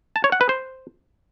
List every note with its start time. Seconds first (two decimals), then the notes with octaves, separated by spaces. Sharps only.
0.16 A5
0.24 C#5
0.32 F#5
0.41 B4
0.49 C5